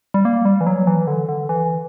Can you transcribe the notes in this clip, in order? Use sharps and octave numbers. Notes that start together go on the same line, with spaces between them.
G3
A#3
G3
E3
F#3
E3
D3
D3
E3